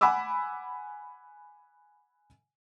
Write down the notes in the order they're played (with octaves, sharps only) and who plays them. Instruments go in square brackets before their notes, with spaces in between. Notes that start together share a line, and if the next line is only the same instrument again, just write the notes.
[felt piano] F#5 G#5 B5 D6 E6